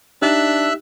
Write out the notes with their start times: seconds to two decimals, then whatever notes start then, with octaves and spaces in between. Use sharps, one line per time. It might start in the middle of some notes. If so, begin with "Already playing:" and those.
0.22 D4 D#4 G4 E5 E6 F#6